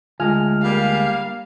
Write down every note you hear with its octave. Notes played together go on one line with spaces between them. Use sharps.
D2 G#3 F4 G#5 F6
G3 A#3 F5